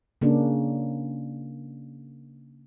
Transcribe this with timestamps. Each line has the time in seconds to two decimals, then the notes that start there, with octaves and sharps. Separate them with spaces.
0.21 C#3 A#3 C#4 D4